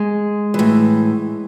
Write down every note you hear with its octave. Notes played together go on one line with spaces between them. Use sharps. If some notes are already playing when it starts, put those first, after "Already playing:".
Already playing: G#3
A2 E3